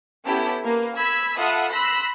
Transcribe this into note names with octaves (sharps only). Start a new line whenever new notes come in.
B3 C#4 E4 G4 A4
A#3 B4
B5 E6 G#6 B6
F4 A4 E5 F#5 B5 D#6
B5 C6 E6 F#6 A#6 B6